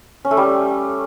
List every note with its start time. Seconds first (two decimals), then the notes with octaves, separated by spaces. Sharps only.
0.25 C#4
0.31 A3
0.37 G3